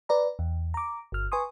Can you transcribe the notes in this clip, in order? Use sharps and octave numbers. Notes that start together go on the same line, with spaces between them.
B4 D5 A#5
E2
A#5 D6
G1 F6
B4 G#5 C6 C#6 D#6